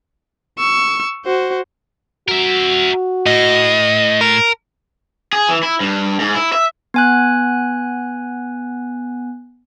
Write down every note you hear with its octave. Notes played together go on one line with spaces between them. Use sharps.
C#6 E6
F#4 C5
F#4 A#4 E5
A2 D#5
A#4
G#4
E3
E4
G2
G#2
E4
E5
B3 G#5 F#6